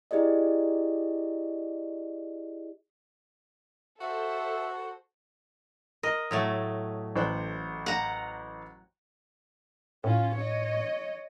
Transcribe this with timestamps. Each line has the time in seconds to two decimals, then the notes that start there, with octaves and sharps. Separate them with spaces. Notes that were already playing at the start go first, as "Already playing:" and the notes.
0.11 E4 G4 G#4 D5 D#5
4.01 F#4 A4 C5 E5
6.03 A#4 D#5
6.31 A2 F#3 A3 D#6
7.16 A1 C5 F#6
7.86 F#5 A#5
10.04 A2 C#4 F4
10.37 C#5 D#5